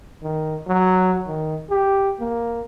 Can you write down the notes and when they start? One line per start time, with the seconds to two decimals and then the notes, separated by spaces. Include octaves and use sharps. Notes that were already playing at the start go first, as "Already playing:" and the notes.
0.22 D#3
0.67 F#3
1.27 D#3
1.70 G4
2.20 A#3